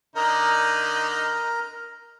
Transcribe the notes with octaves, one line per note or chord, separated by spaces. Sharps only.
D3 D#4 A#4 A#5